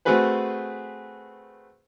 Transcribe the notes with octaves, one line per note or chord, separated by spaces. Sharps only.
A3 C4 F#4 G#4 B4 C5